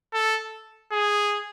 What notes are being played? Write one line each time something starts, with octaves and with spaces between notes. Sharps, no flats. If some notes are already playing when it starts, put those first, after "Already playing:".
A4
G#4